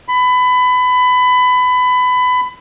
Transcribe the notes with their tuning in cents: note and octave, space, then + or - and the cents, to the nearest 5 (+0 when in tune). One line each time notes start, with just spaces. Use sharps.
B5 +25